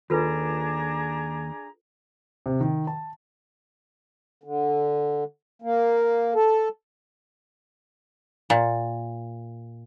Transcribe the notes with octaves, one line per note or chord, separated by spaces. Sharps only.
D#2 D4 F4 G#4 A4 B4 A#5
C3
D#3
A5
D3
A#3
A4
A#2